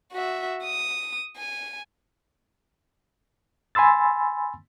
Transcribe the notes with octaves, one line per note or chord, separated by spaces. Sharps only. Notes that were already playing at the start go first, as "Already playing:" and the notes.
F#4 E5
D#6
G#5
G#5 B5 C6 E6 A6